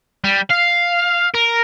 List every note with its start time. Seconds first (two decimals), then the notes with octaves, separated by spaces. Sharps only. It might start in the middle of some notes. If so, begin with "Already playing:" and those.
0.24 G3
0.50 F5
1.34 A#4